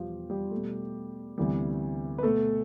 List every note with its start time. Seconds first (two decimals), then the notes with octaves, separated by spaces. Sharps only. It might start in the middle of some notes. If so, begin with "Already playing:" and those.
Already playing: E2 B2 F3 G3 B3 F4 G4
0.30 G3 G4
0.51 B2 A3
1.38 D2 C3 E3 G3 B3
2.18 B4
2.23 B2 A3 B3 A4